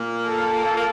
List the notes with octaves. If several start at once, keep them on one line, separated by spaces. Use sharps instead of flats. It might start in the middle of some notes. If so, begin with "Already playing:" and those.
Already playing: A#2 A#3
A4
A#3